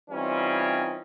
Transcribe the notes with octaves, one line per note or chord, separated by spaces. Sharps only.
E3 G3 C4 C#4 D#4 F4